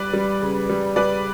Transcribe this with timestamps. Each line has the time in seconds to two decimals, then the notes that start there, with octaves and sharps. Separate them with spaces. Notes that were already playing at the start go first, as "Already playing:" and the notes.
Already playing: G3 B4 D5
0.13 G3
0.42 C#3
0.69 G3
0.96 G3 B4 D5